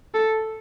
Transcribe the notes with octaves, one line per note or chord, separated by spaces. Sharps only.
A4